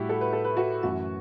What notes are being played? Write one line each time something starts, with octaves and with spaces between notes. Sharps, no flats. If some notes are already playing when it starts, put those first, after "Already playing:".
Already playing: A2 G3 E4 F#4 G4
A4
B4
A4
B4
F#4 A4
F#2 E3 A3 F#4